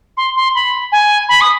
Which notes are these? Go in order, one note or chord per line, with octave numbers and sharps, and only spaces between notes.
C6
C6
B5
G#5
B5
D#6